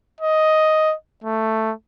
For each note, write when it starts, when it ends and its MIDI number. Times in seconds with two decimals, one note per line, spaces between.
0.21 0.95 75
1.24 1.73 57